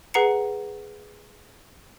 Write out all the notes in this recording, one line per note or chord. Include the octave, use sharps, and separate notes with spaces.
G#4 B4 F#5 A#5 C7 C#7